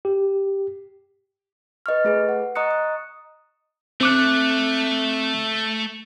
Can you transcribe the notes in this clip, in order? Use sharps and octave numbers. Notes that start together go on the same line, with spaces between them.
G4
B4 D#5 C#6 F6
A3 G#4 B4
F#5
D#5 A#5 C#6 D#6 F#6 C#7
D#6
A3 C4 D6 F#6